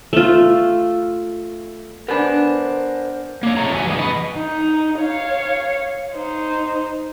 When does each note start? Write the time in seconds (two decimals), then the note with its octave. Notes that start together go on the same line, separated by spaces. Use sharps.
0.13 A3 F4
2.08 B3 D4 A#4 C5 G#5
3.43 A#3 C#5
3.57 C3 G#3 E4 A4 C#5 A#5
3.73 E3 F#4 G#5
3.85 G2 E3 G#3 G#4
3.98 B4 D#5
4.36 D#4
5.00 C#5 F5
6.14 D#4 C5